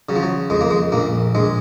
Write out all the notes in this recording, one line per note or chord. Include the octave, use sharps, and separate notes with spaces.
C#3 F#3
F3
F#3
F2 G#3
A#3
G#3
A#1 A#3
A#1 G#3